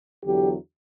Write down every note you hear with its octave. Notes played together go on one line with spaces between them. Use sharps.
E2 D3 F#3 G4